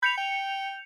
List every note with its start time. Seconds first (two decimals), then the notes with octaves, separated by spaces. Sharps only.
0.03 B5 G6 C#7 F7
0.18 G5